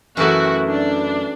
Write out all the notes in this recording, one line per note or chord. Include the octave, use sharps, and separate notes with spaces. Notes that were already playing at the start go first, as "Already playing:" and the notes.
F#2 E3 A3 E4 F#4
D4